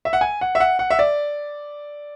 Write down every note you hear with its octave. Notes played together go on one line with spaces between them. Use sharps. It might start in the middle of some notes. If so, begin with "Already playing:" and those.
E5
F#5
G#5
F#5
E5
F#5
F#5
E5
D5